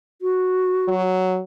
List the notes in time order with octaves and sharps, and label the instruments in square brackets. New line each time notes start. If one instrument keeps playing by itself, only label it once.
[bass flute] F#4
[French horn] F#3